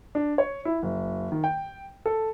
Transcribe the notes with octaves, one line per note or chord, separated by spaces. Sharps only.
D4
C#5
E4
F#1
D#3
G5
A4